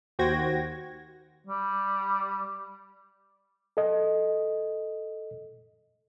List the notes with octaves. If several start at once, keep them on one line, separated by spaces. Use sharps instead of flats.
D#2 F#4 C5 G5 G#6 A#6
G3
A4 D#5